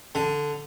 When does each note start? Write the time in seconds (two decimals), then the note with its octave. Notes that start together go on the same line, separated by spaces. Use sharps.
0.15 D3